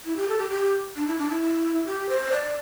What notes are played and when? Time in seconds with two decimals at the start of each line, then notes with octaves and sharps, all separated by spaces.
0.05 E4
0.17 G4
0.28 A4
0.39 G4
0.51 G4
0.96 D4
1.07 E4
1.19 D4
1.30 E4
1.86 G4
2.09 C5
2.32 D5